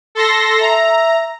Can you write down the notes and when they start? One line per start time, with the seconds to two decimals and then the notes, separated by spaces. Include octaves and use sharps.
0.15 A4 C6 A#6
0.61 E5 A#5